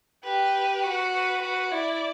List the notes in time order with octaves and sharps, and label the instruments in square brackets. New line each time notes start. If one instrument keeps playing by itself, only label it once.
[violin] G4 [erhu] B4
[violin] F#4
[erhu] B4
[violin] F#4
[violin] E4 [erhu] D5